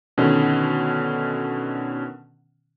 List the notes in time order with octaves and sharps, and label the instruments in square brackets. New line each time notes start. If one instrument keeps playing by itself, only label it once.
[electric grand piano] B2 D3 D#3 C#4